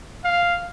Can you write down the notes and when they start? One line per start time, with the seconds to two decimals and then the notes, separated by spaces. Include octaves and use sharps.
0.24 F5